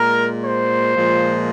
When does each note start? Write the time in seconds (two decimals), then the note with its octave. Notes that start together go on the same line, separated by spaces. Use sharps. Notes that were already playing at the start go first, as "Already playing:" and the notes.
Already playing: A#2 G#3 A#4
0.41 C5
0.95 A#2 F3 G#3